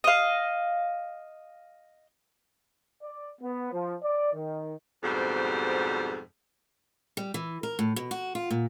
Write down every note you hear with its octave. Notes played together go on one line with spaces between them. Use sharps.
D#5 F5
D5
B3
F3
D5
D#3
F2 G#2 B2 G3 C5
G3
E3
A#4
A2
B2
F#4
F4
A#2